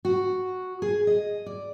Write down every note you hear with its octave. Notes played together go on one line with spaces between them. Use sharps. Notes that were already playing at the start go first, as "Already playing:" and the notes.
F#4
G#4
D#5
D5